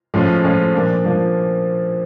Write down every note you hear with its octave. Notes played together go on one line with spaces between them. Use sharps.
A2 F3 G#3 C#4 F4
A2 F3 G#3 C#4 F4
A#2 F3 A#3 D4
A#2 F3 A#3 D4